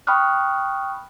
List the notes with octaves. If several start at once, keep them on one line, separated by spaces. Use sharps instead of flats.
G5 B5 C#6 D#6 F6 F#6